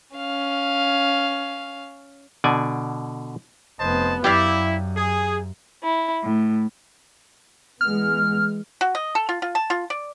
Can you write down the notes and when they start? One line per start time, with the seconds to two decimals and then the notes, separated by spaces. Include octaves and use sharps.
0.16 C#4 F5
2.44 B2 D3 D5 G#5
3.80 F1 B3 C5 D#5 A5
4.24 F#2 E4 G4 D5 F5
4.97 G#4
5.83 E4
6.23 A2
7.81 E3 G#3 B3 F6
8.81 F#4
8.95 D#5
9.15 A4
9.29 F4
9.42 F4
9.55 A5
9.70 F4
9.90 D5